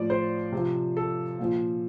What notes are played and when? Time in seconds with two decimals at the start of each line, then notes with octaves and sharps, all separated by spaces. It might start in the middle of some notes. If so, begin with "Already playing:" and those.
Already playing: A2 F3 D5
0.10 C5
0.52 C3 F3
0.97 A4
1.39 A#2 F3